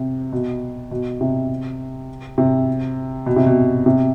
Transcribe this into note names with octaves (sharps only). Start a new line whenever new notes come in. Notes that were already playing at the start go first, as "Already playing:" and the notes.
Already playing: C3
B2
B2
C3
C3
B2
C3
B2
C3